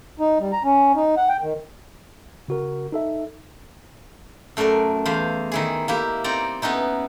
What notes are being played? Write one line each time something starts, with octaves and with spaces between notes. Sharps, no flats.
D#4
G3
A#5
C#4
D#4
F#5
G5
D#3
C#3 F#4 A#4
D#4 A4 E5
F#2 A3 A#4 D5 C6
E2 C5 F5 B5
D#3 E4 G#4
A#3 E4 G4
C4 D#4 D5 A#5
B3 C#4 D#4 E4